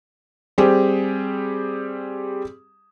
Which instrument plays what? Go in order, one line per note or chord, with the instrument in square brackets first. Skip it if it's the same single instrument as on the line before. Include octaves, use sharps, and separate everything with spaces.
[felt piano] G3 C4 G4 G#4